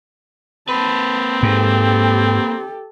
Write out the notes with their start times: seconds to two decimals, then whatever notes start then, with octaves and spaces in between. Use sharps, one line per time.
0.69 A#3 C4 B4 A5
1.43 G#2 G4 A4